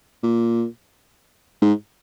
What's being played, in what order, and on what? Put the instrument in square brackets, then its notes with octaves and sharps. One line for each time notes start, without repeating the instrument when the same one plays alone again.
[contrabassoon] A#2
G#2